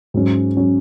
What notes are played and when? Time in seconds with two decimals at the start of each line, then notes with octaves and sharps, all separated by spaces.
0.14 G#2 F#3 C#4
0.57 F#3 C#4